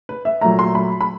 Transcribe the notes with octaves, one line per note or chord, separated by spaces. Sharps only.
B4
E5
A#2 F#3 A3 A#5
C6
B5
B5